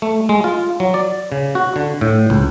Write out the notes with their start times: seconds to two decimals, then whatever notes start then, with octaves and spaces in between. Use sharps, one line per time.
0.02 A3
0.29 G#3
0.44 F4
0.80 F#3
0.94 D5
1.32 C#3
1.55 F#4
1.76 D3
2.01 A2
2.30 C#2